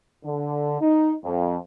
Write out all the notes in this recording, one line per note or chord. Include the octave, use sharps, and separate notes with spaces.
D3
D#4
F2